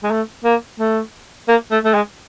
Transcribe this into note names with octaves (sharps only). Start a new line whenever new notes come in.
G#3
A3
A#3
A3
A#3
A3
A3
G#3